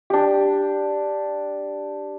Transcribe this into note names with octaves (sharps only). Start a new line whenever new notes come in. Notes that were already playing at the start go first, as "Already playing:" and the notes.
D4 G4